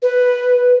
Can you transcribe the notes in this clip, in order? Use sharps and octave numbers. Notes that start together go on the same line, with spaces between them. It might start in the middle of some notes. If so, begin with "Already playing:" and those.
B4